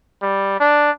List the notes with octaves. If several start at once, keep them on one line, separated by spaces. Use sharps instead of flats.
G3
D4